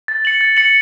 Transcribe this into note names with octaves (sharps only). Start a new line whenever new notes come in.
A6
C#7 F#7
A6
C#7 F#7